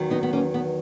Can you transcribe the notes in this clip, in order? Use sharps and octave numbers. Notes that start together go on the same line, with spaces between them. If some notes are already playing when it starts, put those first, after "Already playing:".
Already playing: E2 D#3 F#3
B3 D#4
B3
A#3 C#4
B3